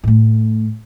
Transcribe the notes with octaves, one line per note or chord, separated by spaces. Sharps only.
A2 A3